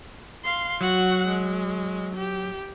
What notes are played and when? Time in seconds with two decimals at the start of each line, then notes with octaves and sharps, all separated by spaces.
0.44 F5 C6
0.81 F#3 F#4 F#5
1.27 G#3
2.16 G4